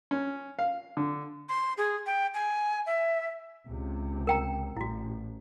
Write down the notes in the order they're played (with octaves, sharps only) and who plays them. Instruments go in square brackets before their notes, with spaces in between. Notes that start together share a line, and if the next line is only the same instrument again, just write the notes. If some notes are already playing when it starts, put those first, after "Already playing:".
[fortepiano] C#4
F5
D3
[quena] C6
G#4
G5
G#5
E5
[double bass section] C#2 C3
[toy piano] A#4 G5 A#5
[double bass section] A1 [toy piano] E4 F#4